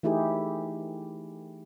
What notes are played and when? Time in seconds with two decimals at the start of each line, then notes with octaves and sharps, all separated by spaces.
0.03 E3 A3 D#4 E4 G4 G#4